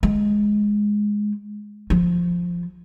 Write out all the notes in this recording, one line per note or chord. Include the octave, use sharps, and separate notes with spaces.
G#3
F3